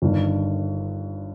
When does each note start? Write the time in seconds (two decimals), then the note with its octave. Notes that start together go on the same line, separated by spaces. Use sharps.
0.02 G1 G2 D#3